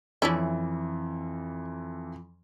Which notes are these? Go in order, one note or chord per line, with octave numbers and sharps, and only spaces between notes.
F2 E3 C#4 D4 E4